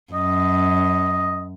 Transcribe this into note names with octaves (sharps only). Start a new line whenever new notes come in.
F#2 D#5